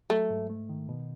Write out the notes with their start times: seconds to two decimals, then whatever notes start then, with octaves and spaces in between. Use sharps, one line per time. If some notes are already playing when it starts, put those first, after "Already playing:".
0.10 F#3 A3
0.30 G#2
0.50 A3
0.69 D#3
0.89 B2